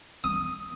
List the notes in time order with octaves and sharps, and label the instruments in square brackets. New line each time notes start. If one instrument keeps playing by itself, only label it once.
[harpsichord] D#6